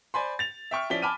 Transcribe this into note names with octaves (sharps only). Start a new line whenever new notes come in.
C5 D5 G#5 B5 C6
A6 F7
E5 G5 C#6 F6
F3 C#4 E4 D5 B6 G7
G#5 A5 B5 D6 F6 D#7